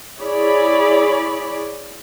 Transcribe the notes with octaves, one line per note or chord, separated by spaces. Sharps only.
E4 G#4 C#5 D5 B5